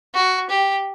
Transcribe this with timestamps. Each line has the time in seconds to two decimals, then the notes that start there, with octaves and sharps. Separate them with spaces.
0.15 F#4
0.50 G4